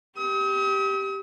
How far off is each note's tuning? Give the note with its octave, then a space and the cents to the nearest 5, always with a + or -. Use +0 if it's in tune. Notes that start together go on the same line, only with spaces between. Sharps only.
G4 +0 D#6 +45